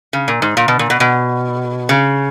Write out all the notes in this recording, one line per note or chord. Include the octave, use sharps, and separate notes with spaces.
C#3
A#2
G#2
A#2
B2
A#2
B2
B2
C#3